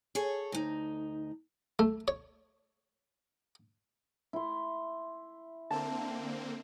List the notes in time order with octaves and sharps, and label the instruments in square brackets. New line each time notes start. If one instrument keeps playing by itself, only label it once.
[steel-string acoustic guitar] G#4 A4 C#5
D2 D#4
[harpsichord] A3
C#5
[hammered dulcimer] E4 C6
[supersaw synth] D3 A#3 C4 [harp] A5